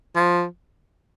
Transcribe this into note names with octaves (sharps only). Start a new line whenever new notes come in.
F3